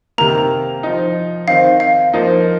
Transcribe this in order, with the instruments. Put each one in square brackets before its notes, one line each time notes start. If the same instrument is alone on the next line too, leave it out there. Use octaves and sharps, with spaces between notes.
[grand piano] C3 D#3 A#3 [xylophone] A#5
[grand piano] F3 D#4
[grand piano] D#3 C4 D#4 [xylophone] F5
[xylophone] F5
[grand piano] F3 A#3 D#4